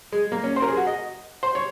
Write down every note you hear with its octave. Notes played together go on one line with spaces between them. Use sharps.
G#3
A#3
C#4
C5
A#4
G#4
F#4
D#5
C5
C#5